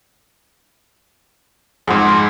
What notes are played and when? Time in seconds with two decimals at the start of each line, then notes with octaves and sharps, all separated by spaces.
1.88 F2 G#2 G#4 F#5 C6